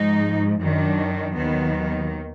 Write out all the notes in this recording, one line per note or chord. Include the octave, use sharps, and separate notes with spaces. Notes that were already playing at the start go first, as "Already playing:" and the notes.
Already playing: G#2 F3 D#4
F#2 D#3 F#3 D4
D#2 D#3 F#3 B3